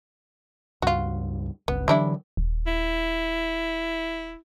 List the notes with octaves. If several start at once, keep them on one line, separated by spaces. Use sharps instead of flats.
C#2 G2 F4 F#4
G1 C#2 B3
D3 E3 F#3 G3 D4 E4
D#1
E4